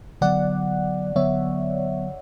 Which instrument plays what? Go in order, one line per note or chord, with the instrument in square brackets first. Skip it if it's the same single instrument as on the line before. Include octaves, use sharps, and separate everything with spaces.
[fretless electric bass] D3 F#3 B3 [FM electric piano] D5 F#5
[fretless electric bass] D3 F#3 B3 [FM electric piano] C#5 E5